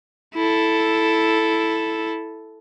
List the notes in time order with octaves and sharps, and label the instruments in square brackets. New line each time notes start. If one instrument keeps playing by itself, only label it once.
[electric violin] E4 A4